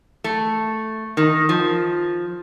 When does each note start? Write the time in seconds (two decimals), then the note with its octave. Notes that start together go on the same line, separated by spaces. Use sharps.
0.24 A3
1.17 D#3
1.49 F3